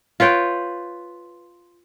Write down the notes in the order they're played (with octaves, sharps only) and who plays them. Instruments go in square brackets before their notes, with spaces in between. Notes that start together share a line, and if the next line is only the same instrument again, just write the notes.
[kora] F4 B4 C#5 G5